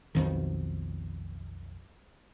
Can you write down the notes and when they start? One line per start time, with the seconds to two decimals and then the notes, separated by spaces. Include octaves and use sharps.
0.15 B1 F2 D#3